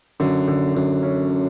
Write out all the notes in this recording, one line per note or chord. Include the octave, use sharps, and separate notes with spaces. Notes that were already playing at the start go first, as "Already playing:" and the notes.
F#2 D3
D3
F#2 D3
C#4